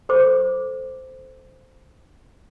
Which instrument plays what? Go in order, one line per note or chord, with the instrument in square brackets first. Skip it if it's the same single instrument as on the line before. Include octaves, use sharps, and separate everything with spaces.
[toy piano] A4 C5 B5 D6